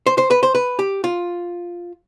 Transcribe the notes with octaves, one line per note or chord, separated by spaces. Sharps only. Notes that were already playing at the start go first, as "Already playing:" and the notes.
C5
C5
B4
C5
B4
G4
F4